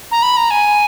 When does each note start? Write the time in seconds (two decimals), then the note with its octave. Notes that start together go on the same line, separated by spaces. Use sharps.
0.11 A#5
0.22 B5
0.37 A#5
0.51 G#5